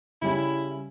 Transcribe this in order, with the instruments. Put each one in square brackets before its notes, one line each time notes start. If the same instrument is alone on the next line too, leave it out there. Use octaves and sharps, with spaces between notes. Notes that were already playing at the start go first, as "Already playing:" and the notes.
[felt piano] C#3 G3 C#4 [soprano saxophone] E4